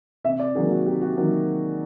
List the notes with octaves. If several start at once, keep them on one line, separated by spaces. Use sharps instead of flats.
C3 E5
D5
D#3 F#3 A#3 G#4
F#4
C3 G4
F#4
D#3 F#3 A#3